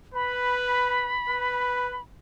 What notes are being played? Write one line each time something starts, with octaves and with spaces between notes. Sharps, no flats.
B4 B5
B4